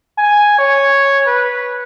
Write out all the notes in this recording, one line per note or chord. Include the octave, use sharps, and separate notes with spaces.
G#5
C#5
B4